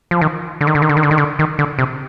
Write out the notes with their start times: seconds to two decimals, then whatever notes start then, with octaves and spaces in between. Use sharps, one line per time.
0.11 F3
0.21 D#3
0.61 D3
0.67 D#3
0.75 D3
0.82 D#3
0.89 D3
0.97 D#3
1.03 D3
1.11 D#3
1.18 D3
1.39 D#3
1.59 D3
1.79 C3